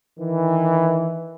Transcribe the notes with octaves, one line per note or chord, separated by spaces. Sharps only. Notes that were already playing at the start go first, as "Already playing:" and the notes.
D#3 E3